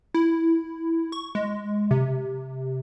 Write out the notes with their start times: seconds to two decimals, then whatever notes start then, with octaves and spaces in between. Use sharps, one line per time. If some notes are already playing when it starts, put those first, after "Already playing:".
0.14 E4
1.12 C#6
1.35 G#3
1.91 C3